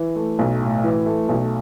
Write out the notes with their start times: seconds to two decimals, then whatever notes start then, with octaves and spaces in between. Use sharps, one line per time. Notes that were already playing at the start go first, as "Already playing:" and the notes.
Already playing: E3
0.16 A3
0.39 B1
0.61 A2
0.84 E3
1.06 A3
1.29 B1